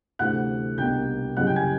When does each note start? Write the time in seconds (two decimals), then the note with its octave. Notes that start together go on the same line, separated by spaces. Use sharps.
0.19 D2 C3 E3 A3 D4 F#5 F#6
0.77 C2 B2 G3 A#3 D4 G5 G6
1.36 F#1 F#2 C#3 E3 G3 F#5 F#6
1.47 G5 G6
1.56 G#5 G#6